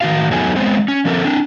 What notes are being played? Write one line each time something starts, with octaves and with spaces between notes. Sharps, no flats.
A2 D#3 A#3 F#4 F5
E2 F#3 A3 B3 D#4 G#5
G#3 B3 C4 C5
C#4
F3 C4 A4 A#4
C4 D4